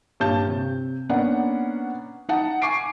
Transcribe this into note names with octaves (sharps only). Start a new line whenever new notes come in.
G2 A#2 C#5 A5 G6
C3
A#3 B3 C#4 D4 F#5
D#4 F#5 A5
G#5 C#6 D6 C7 D7